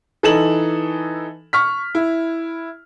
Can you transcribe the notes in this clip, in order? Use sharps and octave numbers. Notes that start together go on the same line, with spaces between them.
E3 D#4 A4 E7 F#7
C#6 F6 B6
E4